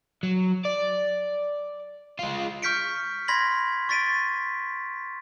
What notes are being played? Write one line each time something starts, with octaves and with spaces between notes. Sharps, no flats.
F#3
D5
G#3 F4
C#6 F6 G6 B6 C#7 D7
B5 C6 G#6 A#6 B6 F#7
C#6 A6 B6 D7 D#7